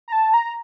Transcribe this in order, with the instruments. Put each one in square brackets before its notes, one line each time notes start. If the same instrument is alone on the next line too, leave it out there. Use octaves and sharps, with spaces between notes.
[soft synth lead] A#5
A5
A#5